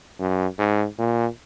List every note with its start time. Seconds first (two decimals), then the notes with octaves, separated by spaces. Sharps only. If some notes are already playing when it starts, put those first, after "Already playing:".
0.19 F#2
0.58 G#2
0.99 A#2